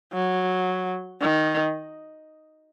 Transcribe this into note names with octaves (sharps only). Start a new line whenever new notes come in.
F#3
D#3